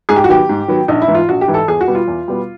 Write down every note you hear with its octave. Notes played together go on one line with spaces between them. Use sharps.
G#2 G#4
G4
F#4
D#3 F#3 B3 G4
G#2
D#3 F#3 B3
A#1 D#4
E4
G#2 E3
F4
A#1 F#4
G4
G#2 E3
A4
E2 G#4
F#4
B2 G3 B3
F4
E2
B2 G3 B3